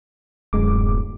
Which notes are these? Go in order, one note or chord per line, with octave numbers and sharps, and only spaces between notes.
D1 F#2 G#3 D6